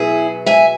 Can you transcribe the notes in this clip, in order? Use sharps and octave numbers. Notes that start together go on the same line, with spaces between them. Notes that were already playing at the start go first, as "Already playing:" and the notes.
Already playing: B2 F#3 B3 E4 G#4
E5 G#5